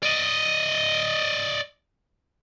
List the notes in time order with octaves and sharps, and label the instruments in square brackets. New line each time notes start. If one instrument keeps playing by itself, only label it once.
[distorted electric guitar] D5 D#5